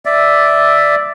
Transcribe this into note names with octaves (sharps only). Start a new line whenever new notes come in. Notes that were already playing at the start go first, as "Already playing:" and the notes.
D5 E5